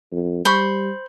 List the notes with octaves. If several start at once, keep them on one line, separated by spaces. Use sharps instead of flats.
F2
G3 C5 B5 C#6